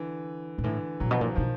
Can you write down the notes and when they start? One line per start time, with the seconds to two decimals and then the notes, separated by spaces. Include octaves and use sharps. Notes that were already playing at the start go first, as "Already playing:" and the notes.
Already playing: D3 E3
0.58 A#2
0.64 A2 D3 E3
1.00 A#2 F#3
1.11 B2 F3
1.21 A#2
1.23 E3
1.35 B2 D#3 F3